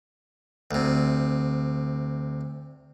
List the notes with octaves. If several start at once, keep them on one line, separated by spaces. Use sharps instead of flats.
D2 C3